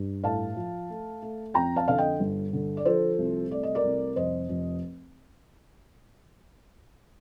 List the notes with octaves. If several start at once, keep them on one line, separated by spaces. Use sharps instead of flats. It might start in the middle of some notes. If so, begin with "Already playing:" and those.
Already playing: G2
A2 F5 A5
F3
A3
A3
F2 G5 A#5
F5 A5
D3 F5
D#5 G5
G1
D3
D5
F3 A4 C5
C2
A3 D5
D#5
A#4 D5
C2
F1 C5 D#5
F1